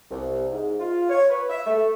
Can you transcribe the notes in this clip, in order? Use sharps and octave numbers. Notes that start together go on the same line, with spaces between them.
C2
G#2
F4
C#5
B4
E5
A3